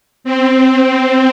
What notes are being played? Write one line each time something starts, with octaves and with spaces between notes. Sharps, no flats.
C4